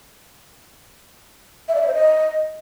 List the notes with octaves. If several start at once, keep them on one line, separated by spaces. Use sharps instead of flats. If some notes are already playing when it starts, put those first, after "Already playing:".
E5
D5
E5
C5
D#5